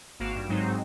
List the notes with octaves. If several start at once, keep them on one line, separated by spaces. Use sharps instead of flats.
G#1 A#3 F#4 F5 D7 E7
G2
G#2 F#3 G#3 C4 D#4